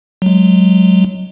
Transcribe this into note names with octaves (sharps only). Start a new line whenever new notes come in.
F#3 G#3